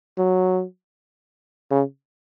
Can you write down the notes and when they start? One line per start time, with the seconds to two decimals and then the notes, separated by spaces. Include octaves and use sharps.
0.17 F#3
1.71 C#3